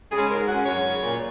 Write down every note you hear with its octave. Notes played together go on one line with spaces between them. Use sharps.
C#3 G#3 C#4 G#4
G#2 A#4
G#3 C#4 F#4
F#2 C#5
C#3 F#3
A#2